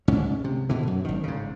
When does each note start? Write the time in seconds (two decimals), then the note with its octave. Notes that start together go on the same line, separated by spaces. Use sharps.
0.08 C#2 G#2 C#4
0.44 C3
0.69 B2 D3 E3
0.87 F#2
1.04 G#1 D#3
1.24 G#2 C#3